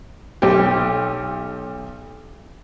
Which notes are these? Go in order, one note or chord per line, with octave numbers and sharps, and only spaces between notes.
B1 G4